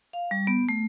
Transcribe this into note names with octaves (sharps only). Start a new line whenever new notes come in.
F5
G3
B3
A3